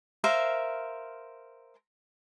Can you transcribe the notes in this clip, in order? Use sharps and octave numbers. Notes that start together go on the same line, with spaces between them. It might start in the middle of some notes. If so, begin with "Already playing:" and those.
A#4 C5 E5 F5